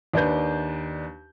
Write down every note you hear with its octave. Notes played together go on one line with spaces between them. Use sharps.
D#2 D4 B4 G6